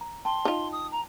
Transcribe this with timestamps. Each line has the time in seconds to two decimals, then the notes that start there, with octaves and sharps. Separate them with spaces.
0.01 A#5
0.25 G5 A5 C6
0.45 D#4 F4
0.72 D#6
0.92 A#5